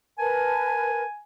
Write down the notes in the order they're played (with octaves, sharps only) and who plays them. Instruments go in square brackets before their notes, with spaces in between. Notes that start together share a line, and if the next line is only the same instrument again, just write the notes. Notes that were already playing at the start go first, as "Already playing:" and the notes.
[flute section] A#4 B4 A5 [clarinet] G#5